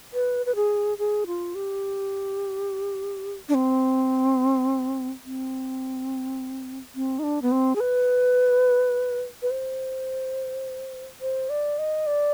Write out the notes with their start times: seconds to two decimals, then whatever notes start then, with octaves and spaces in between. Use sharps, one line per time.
0.13 B4
0.46 B4
0.56 G#4
0.99 G#4
1.27 F4
1.55 G4
3.49 D4
3.54 C4
5.25 C4
6.95 C4
7.19 D#4
7.23 D4
7.42 B3
7.52 C4
7.76 G#4
7.81 B4
9.42 B4
9.51 C5
11.21 C5
11.50 D5
11.78 D#5
12.07 D5